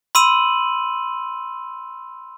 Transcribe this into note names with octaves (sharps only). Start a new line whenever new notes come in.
B5 C6 E6 D#7 F#7